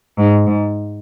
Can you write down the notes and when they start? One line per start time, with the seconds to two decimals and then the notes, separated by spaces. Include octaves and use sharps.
0.18 G#2
0.47 G#2